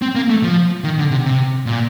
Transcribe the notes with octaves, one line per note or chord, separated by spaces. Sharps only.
C4
A#3
A3
F3
D#3
D3
C3
C3
A#2